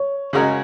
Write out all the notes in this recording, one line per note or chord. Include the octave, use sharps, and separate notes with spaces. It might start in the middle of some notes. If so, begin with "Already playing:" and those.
Already playing: C#5
C#3 G#3 F#4 A#4
D#5